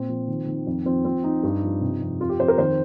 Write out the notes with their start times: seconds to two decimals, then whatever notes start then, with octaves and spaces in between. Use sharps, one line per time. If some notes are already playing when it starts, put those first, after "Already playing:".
Already playing: A#2 C4
0.09 F3
0.28 D#3
0.47 D#3
0.67 F2
0.85 F3 C4
1.05 F3 C4
1.24 F3 D#4
1.43 G2
1.63 F3
1.81 C3
2.01 F2
2.21 F2 F4
2.29 G4
2.39 F2 C5
2.48 A#4
2.58 D#3 C5